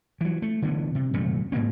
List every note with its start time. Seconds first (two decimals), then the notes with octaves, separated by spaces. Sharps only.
0.21 E3 F#3
0.42 A3
0.62 D3 E3 B3
0.95 C3
1.14 D#1 F#2 C3 A3
1.52 G#2 B2 A#3 C4